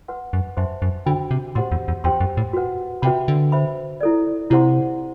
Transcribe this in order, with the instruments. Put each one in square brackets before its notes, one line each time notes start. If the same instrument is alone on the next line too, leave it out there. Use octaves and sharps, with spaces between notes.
[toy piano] B4 F#5 C6
[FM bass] F#2
[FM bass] F#2 [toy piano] C5 E5 A5 C6
[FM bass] F#2
[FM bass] D3 [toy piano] D4 F#4 C5 G5 B5
[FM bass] C3
[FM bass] A2 [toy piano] G4 C5 F#5 C6
[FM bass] E2
E2
[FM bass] E2 [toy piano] G4 C5 G5 C6
[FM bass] F#2
A2
[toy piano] F#4 B4 F#5
[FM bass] C3 [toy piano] F#4 B4 E5 G5 B5
[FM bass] D3
[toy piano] C5 E5 B5
E4 A4 D5
[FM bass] C3 [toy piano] E4 G4 C5 F#5 C6